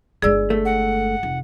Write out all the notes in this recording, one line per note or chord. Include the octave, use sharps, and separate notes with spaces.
G1 G#3 G#4 D5 E6
A3
F#5
F1